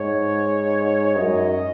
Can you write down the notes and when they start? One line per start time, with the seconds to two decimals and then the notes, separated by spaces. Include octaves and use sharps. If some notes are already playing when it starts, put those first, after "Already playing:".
Already playing: G#2 C#5
1.16 F#2 D#5